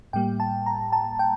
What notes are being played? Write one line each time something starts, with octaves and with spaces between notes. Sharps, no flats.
A2 G3 A#3 G5
A5
A#5
A5
G5